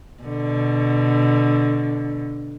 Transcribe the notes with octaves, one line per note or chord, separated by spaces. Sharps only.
B2 D3